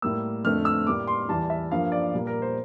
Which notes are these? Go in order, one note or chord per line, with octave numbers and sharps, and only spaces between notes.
A2 G3 A#3 E6
F2 D3 A3 C4 F6
E6
A2 G3 A#3 D6
C6
E2 E3 G3 A5
E5
G2 F3 A#3 F5
D5
A#2 G3 A#3
A#4
C5